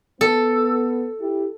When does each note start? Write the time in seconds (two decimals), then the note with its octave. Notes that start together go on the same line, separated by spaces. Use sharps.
0.21 B3 A4
1.21 E4 G4